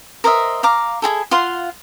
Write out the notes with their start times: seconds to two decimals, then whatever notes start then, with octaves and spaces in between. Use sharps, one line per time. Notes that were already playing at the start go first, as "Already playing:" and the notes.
0.24 A#4 C5 D#5 E5
0.63 F5 A#5 D6
1.02 E4 F4 G#4 A4
1.31 F4 F5 F#5 C6